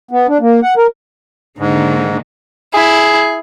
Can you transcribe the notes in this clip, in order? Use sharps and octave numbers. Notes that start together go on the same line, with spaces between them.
B3
D4
A#3
F#5
A#4
G#2 D3 D#3 A#3
E4 G#4